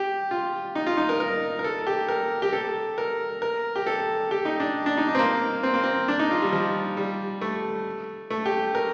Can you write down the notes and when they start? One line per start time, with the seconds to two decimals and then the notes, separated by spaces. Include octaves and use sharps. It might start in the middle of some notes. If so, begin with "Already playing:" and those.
Already playing: G4
0.31 F4
0.75 D#4
0.86 F4
0.97 D#4
1.09 A#4
1.20 A#4
1.59 A#4
1.64 A4
1.87 G4
2.08 A#4
2.42 G4
2.53 A4
2.98 A#4
3.42 A#4
3.76 G4
3.87 A4
4.31 G4
4.45 D#4
4.60 D4
4.86 D4
4.98 D#4
5.08 D#4
5.15 C4
5.19 A#3
5.63 C4
5.74 A#3
5.83 C4
6.08 D4
6.19 D#4
6.31 F4
6.42 G3
6.53 F3
6.97 G3
7.41 A3
8.30 A3
8.46 G4
8.75 A#4